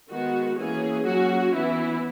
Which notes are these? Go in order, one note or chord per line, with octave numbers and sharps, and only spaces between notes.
D#3 G#3 B3 F#4
E3 A#3 C#4 G#4
F#3 A#3 C#4 F#4
E3 B3 E4